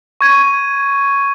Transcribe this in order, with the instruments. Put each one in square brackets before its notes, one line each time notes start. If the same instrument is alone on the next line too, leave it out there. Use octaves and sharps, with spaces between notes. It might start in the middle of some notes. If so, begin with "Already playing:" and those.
[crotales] C#6 G#6 D#7